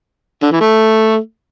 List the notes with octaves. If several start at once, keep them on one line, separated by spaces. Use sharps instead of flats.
D3
E3
A3